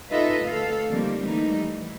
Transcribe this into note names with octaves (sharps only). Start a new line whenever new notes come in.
D#4 F4 A4 B4 D#5 E5
D2 A4 F5
D3 D#3 F3 G3 A#3 C4
E3 G3 A3 A#3 D#4
E3